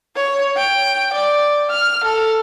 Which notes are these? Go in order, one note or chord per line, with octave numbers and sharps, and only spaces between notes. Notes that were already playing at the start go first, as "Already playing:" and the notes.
C#5
G5
D5
F6
A4